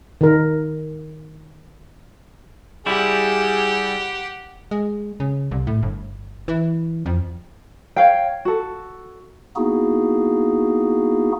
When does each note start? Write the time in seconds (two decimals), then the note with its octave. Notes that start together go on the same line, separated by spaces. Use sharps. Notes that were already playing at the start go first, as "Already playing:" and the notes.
0.21 D#3 A#4
2.86 G3 E4 G4 G#4 F#5
4.71 G#3
5.20 C#3
5.51 C2
5.67 A2
5.83 G1
6.48 E3
7.06 F2
7.96 C#5 F5 G5
8.45 F#4 A4
9.56 A#3 B3 D#4 E4 F#4 G#4